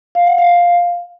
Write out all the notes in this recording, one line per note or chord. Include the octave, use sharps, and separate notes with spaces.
F5
F#5
F5